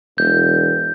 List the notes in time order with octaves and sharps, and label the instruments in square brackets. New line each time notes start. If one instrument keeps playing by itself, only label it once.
[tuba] E1 [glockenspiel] G6